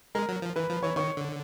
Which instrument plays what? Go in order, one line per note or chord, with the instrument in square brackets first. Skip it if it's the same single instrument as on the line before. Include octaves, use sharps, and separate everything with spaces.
[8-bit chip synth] G#3 [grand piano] A#4 A#5
[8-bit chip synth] F#3
F3
[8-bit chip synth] E3 [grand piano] B4 B5
[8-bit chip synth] F3
[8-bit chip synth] E3 [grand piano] C#5 C#6
[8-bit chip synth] D#3 [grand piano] C#5 C#6
[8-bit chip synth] D3